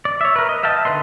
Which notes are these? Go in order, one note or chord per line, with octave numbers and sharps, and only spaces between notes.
D5
C#5 E5
A#4 B4
D#5
E5 F5 G5 A5
D3 D#4 B4 D#5 C6